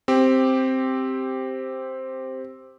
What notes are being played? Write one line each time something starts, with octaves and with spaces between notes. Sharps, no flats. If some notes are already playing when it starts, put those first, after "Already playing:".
C4 G4